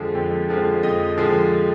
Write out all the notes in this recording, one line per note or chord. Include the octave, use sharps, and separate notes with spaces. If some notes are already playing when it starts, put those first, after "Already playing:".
Already playing: F2 D3 F3 G#3
F2
D3 F3 G#3
F2 D#5
D3 F3 G#3